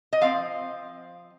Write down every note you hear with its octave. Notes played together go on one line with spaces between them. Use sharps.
D#5
F3 C4 F5